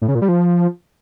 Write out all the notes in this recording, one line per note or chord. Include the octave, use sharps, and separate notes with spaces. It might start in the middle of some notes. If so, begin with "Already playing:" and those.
A2
C#3
A#2
G3
F3